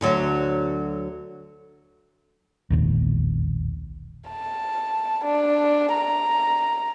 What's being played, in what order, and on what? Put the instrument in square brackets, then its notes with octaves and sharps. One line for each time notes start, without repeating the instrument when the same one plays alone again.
[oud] D2 D3 F#3
[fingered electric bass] E1 A#1 D#2
[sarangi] A5
D4
A#5